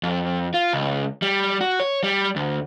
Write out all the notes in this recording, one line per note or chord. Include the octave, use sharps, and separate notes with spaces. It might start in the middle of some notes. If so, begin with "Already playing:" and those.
F2
F4
C#2
G3
F#4
C#5
G3
D2